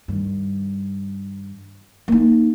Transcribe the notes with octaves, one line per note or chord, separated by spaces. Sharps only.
G2 D#3
A#3 D#4